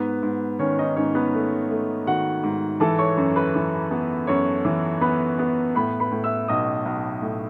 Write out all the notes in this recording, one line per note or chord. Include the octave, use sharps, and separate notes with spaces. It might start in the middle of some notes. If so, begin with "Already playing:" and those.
Already playing: G#2 B3 B4
G#2
D#3 C#4 C#5
D#4 D#5
G#2 C#4 C#5
B3 B4
A3
A3
D#3 F#4 F#5
G#2
E3 A4 A5
C#5 C#6
F#2
B4 B5
E3
B3
F#2 C#5 C#6
E3
B3 B4 B5
B3
A2 B4 B5
B4 B5
A2
E5 E6
B1 D#5 D#6
B1
A2